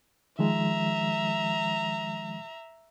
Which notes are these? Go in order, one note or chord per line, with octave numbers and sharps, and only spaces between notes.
D#3 F3 G#3 E5 A#5